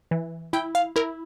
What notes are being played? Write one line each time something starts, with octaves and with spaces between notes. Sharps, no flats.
E3
E4 G5
F5
E4 A#4